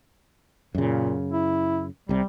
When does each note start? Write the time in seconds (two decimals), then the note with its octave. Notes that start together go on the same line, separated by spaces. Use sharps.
0.75 F#2 A#2 C#3
1.32 E4
2.09 C2 C3 G3